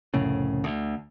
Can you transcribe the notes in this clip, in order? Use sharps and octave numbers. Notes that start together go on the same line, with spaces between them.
C2 F2 A2 C#3
D2